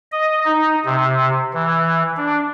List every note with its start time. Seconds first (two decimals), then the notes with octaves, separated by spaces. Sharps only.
0.12 D#5
0.45 D#4
0.86 C3
1.54 E3
2.17 D4